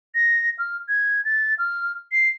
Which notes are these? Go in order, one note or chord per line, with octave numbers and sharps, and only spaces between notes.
A#6
F6
G#6
A6
F6
C7